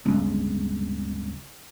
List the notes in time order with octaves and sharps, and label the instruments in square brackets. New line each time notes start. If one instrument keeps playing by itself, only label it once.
[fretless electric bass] D1 G1 C#2